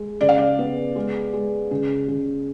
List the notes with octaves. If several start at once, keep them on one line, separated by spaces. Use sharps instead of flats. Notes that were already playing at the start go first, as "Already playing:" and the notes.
Already playing: G#3
C#3 D5
F5
D5
B3
G#3
G#3
C#3
C#3